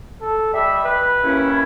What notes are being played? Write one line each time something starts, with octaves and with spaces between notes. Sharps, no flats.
A4
G3 D#5 E5 B5
B4
D#2 C#4 E4